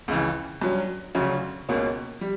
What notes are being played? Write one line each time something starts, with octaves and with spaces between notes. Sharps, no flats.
C#2 C#3 E3
G2 F#3 C#4
D2 C#3 F#3 C#4
C#2 B2 A#3 C#4
G3